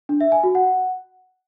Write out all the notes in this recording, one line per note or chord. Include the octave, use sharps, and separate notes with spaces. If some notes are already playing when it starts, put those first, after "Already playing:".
D4
E5
G#5
F#4
F#5